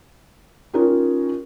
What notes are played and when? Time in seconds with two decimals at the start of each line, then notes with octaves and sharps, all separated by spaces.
0.74 C#4 D#4 F4 G4 A#4 C#5